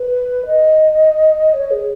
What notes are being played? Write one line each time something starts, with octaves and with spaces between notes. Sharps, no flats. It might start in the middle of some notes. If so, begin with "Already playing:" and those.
Already playing: B4
D#5
C#5
G#4